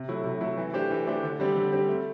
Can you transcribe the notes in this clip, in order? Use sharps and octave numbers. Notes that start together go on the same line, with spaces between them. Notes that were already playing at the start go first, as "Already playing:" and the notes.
Already playing: C3
F#3 A3 E4
C3
F#3 A3 E4
E3
A3 D4 G4 C5
E3
A3 D4 G4 C5
D3
G3 C4 G4
D3
G3 C4 G4
A3